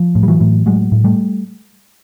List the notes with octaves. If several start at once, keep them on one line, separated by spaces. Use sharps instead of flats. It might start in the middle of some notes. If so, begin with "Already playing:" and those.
Already playing: F3
A2
G3
E3 F#3
A2
A2 F#3 G#3
A2
G3 A3